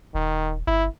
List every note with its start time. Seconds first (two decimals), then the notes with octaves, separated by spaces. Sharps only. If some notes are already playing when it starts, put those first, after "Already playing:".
0.15 D#1 D#3
0.67 G1 E4